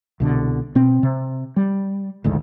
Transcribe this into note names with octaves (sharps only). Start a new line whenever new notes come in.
C2 B2 D3
B2 C4
C3
G3
A1 D2 G#2 D#3